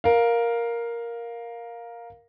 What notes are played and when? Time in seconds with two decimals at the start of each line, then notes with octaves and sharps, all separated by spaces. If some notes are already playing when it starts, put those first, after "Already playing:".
0.04 A#4 F5